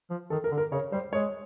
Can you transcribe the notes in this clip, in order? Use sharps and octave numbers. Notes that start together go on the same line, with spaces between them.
F3
D#3 A4
A#4
D3
A#4
C#3 C#5
G3 C5
G#3 C#5